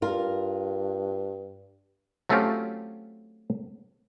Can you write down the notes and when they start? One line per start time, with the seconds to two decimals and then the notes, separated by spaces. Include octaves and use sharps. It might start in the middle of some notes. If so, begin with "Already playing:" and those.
0.02 G2 F4 A#4
2.29 F#3 A3 C4 C#4 F4 G4